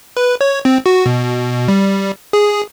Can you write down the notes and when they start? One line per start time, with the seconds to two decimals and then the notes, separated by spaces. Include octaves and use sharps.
0.17 B4
0.41 C#5
0.65 C4
0.86 F#4
1.06 B2
1.68 G3
2.33 G#4